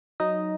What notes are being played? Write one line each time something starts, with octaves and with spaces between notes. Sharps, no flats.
F#3 D#4 D#5